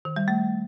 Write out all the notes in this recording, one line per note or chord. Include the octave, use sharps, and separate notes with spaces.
D#3
G3
A3